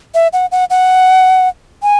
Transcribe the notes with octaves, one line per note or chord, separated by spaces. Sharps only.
E5
F#5
F#5
F#5
G#5